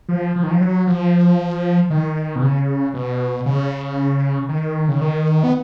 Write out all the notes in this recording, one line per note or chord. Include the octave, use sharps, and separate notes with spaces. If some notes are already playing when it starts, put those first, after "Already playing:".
F3
F3
D#3
F3
F#3
F3
D#3
B2
C#3
B2
C#3
D#3
C#3
D#3
B3